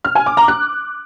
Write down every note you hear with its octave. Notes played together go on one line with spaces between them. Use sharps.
F6
G#5
D6
A#5
F#6